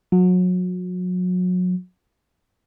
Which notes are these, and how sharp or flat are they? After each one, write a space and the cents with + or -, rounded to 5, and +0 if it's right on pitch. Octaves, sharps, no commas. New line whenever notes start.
F#3 -30